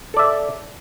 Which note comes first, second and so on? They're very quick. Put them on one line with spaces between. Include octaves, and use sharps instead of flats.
A4 D5 E5